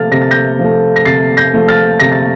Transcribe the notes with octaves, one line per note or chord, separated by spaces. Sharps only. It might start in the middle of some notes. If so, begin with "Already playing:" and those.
Already playing: C3 F3 A3 F6 A6
C3 A#6
A6
G6 A#6
F3 A3
A#6
C3 A6 C7
G6 A#6
F3 A3
F6 A6
C3 A#6
A6